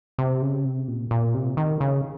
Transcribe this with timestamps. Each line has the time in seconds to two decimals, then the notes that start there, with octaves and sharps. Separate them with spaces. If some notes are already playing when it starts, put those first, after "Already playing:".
0.19 C3
0.42 C#3
0.65 C3
0.88 A#2
1.11 A#2
1.34 C3
1.57 D#3
1.80 C#3